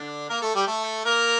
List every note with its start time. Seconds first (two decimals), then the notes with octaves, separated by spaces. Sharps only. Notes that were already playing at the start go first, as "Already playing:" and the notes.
Already playing: D3 D4
0.29 A#3 A#4
0.42 A3 A4
0.55 G3 G4
0.67 A3 A4
1.05 A#3 A#4